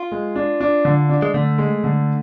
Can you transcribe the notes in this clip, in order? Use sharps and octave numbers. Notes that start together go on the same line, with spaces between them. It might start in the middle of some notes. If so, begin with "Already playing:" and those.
Already playing: F4
G#3
D4
D4
D3
D4
G#3
D3 A3
G#3
D3